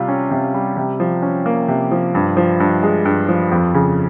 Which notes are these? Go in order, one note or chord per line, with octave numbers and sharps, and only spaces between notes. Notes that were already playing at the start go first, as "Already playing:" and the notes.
Already playing: C3 G3 F4
C#4
C3
G3
C3
F3
C#4
A#3
C3
F3
G2
F3
G2
G#3
G2
F3
F2
C#3